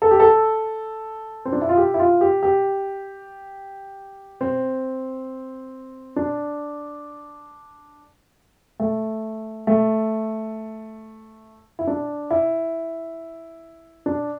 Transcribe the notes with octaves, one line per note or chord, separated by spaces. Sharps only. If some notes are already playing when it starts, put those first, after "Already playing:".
A4
G4
A4
C4
D4
E4
F4
G4
E4
F4
G4
G4
C4
D4
A3
A3
E4
D4
E4
D4